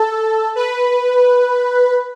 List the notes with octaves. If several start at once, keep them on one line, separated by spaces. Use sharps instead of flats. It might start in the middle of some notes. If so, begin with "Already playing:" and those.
Already playing: A4
B4